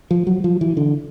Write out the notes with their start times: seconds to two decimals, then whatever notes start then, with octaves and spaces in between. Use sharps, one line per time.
0.11 F3
0.27 F#3
0.44 F3
0.61 E3
0.77 D3